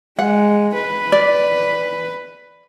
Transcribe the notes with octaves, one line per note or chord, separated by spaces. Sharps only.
G#3 F#5
B4
D5